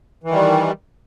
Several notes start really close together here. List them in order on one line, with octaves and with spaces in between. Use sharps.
E3 D#3 G3